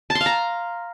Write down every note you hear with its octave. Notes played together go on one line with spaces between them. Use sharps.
A5
C6
F5
A#5